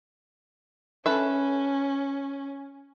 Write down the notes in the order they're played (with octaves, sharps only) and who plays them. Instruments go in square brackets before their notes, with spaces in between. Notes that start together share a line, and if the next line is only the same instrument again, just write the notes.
[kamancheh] C#4 [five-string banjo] A4 B4 E5